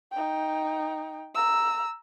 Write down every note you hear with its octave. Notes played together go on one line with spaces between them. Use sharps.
D#4 G5
A#5 E6